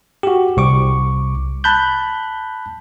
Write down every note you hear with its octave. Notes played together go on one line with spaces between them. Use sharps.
F#4 G4
C2 C#6 D6
A5 B5 F#6 G6